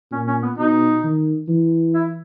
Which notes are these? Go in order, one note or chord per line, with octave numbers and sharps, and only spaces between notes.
A#2 C#4
C#4
B3
B2 D#4
D#3
E3
E4